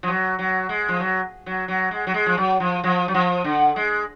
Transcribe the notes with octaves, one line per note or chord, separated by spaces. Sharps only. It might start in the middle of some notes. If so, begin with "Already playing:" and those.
F3
F#3
F#3
G#3
F3
F#3
F#3
F#3
G#3
F#3
G#3
F3
F#3
F3
F3
F#3
F3
D3
G#3